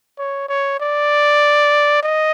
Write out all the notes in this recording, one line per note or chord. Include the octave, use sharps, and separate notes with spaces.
C#5
C#5
D5
D#5